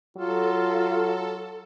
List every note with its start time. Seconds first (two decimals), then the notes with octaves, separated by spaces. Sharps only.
0.17 F#3 F4 A4